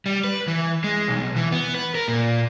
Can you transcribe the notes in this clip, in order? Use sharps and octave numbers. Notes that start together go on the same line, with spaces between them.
G3
B4
E3
G#3
B1
E3
B3
B4
A#4
A#2